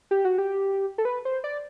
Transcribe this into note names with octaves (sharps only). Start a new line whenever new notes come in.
G4
F#4
G4
A4
B4
C5
D5